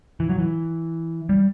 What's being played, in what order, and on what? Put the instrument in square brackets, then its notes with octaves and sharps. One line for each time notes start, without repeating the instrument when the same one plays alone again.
[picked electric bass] E3
F#3
E3
G3